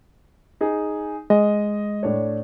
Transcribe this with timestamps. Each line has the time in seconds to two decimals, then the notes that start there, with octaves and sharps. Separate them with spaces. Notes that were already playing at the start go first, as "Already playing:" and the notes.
0.61 D#4 G#4
1.30 G#3 D#5
2.03 A2 D4 C#5